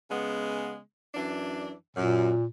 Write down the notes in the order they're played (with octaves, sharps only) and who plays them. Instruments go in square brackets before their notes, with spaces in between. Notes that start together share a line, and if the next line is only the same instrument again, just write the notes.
[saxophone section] C#3 G#3 B3
F#2 E3 D4
[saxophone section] F#2 [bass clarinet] A#2